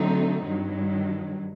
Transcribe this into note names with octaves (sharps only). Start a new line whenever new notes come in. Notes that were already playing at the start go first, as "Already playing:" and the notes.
Already playing: D3 F#3 A3 C4 D#4
G2 D#3 F#3